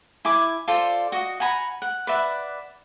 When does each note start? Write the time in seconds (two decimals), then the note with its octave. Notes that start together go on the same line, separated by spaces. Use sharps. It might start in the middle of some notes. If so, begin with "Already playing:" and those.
0.25 E4 G#5 D6
0.68 F4 A4 C5 D5
1.12 F#4 D#5
1.40 F#5 G#5 A#5 B5
1.82 F#5
2.07 B4 D5 E5 F#5